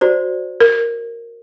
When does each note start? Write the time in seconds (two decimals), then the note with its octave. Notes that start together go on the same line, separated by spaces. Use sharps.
0.01 F#4 C5 D5
0.61 A#4